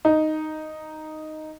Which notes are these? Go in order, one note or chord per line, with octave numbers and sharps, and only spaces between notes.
D#4